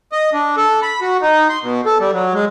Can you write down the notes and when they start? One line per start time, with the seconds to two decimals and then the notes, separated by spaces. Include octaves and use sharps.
0.12 D#5
0.33 D4
0.57 A4
0.82 B5
1.01 F#4
1.22 D#4
1.49 C6
1.63 B2
1.86 A4
2.00 G3
2.13 F#3
2.34 G#3